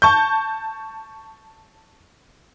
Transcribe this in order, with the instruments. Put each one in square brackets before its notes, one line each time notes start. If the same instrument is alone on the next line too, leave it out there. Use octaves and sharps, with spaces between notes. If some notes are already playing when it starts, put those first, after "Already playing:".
[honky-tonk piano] A5 C#6 G6